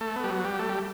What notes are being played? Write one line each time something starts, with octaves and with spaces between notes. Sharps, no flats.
A3
B3
G3
F#3
G3
A3
G3